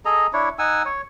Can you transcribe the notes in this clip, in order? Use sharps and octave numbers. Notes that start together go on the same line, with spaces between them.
G#4 A4 D#5 A#5
D4 E4 C#5
D#4 F#5 G#5 E6
C#5